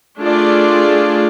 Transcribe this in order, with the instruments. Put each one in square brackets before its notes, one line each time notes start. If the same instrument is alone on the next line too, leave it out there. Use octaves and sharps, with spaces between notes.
[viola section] A3 D4 F4 G#4 D5